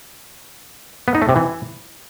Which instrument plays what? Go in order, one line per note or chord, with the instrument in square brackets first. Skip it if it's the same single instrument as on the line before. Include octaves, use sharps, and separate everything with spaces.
[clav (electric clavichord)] B3
D#4
A3
C3
E3